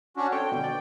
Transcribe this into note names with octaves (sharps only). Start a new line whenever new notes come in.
C#4 D4 F#4
C4 A4 C#5 G5
B2 D3
D5